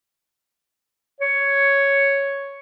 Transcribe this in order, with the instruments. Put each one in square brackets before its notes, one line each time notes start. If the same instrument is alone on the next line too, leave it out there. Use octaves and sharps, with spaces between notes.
[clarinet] C#5